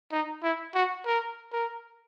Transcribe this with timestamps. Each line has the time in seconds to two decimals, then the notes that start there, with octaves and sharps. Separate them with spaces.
0.12 D#4
0.43 E4
0.75 F#4
1.06 A#4
1.52 A#4